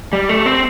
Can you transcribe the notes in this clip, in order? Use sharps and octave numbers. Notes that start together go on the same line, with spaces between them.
G3
A3
C4